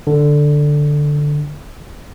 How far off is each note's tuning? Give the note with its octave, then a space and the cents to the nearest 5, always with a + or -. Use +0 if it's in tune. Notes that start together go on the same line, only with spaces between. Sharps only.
D3 +5